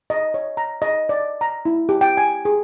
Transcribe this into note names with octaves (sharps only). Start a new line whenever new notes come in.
D#5
C#5
A#5
D#5
D5
A#5
E4
G4
G5
G#5
G#4